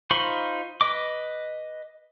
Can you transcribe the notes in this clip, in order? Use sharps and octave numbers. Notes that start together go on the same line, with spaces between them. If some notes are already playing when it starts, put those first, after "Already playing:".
D#4 F4 C5 B5 C#6
B4 D#5 D6